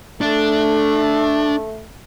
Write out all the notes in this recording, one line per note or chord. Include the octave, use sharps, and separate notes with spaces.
A3 D4